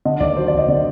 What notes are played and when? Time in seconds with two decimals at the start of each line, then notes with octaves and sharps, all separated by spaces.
0.05 D3 D#5
0.20 D#2 D5
0.37 F#3 C5
0.48 D5
0.53 D#2 D#5
0.68 D3 D5